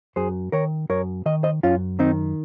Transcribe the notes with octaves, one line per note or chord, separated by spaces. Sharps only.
F#2 G#4 C5
D#3 A#4 C#5
F#2 A#4 C#5
D#3 D#5
C5 D#5
F#2 C#4 F4
D#3 C4 D#4